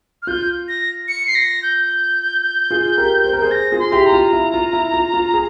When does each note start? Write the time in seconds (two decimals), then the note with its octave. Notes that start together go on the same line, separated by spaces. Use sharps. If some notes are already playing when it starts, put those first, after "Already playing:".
0.22 F6
0.27 F4 G6
0.68 A#6
1.08 C#7
1.27 C7
1.35 A#6
1.63 G6
2.71 F4 G#4
2.98 G4 A#4
3.24 C5
3.33 A#4
3.42 G#4 C5
3.51 A#6
3.72 F4 G#4
3.79 C6
3.92 E4 G4
4.06 A#5
4.13 F4
4.33 E4
4.54 F4
4.73 E4
4.94 F4
5.14 F4
5.34 G#4